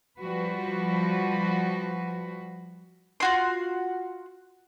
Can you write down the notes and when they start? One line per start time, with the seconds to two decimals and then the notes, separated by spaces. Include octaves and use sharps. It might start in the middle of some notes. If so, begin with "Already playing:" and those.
0.20 F3 G3 F#4 B4
3.20 F4 F#4 C6